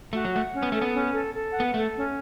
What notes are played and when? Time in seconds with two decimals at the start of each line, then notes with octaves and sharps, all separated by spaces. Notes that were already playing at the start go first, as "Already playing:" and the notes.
0.13 A3 F#4
0.25 F#3
0.33 A3 F#5
0.54 C#4
0.63 B3
0.72 A3 A4
0.82 B3
0.94 C#4
1.14 A4
1.33 A4
1.54 F#5
1.60 B3
1.74 A3 A4
1.94 C#4